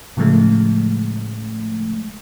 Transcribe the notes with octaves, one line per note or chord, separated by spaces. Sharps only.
A2 C#3 F3 G#3 A3